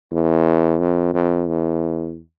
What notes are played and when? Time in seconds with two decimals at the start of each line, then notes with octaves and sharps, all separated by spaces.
0.12 E2
0.80 F2
1.14 F2
1.48 E2